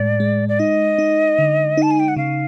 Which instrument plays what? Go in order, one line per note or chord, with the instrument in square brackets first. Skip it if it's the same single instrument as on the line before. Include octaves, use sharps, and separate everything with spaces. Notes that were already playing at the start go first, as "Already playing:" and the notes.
Already playing: [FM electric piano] A2 G#3 [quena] D5
[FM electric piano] G#3
[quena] D5
[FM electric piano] D#4 [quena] D#5
[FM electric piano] D#4
D3
[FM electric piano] D#4 [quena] A5
[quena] G#5
G5
F#5
[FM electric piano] C#3 [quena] F5